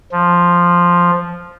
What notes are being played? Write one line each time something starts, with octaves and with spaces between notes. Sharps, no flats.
F3